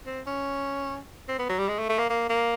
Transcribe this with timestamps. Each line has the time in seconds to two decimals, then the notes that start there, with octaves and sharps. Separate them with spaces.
0.06 C4
0.26 C#4
1.28 C4
1.39 B3
1.49 F#3
1.58 G3
1.68 G#3
1.79 A3
1.89 A3
1.99 A#3
2.10 A#3
2.29 A#3